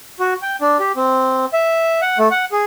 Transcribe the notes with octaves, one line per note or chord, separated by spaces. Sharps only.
F#4
G5
D4
G4
C4
E5
F#5
A3
F#5
G#4